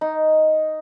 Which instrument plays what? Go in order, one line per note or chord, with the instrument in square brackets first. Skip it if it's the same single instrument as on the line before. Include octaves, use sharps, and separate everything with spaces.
[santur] D#4